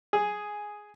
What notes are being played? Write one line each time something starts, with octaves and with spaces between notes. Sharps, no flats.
G#4